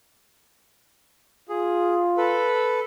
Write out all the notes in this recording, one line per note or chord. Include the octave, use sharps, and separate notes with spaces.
F4 G#4
A4 B4